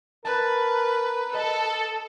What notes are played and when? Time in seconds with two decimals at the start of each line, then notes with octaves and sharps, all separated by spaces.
0.25 A#4 B4 A5 F#6
1.34 A4 D#5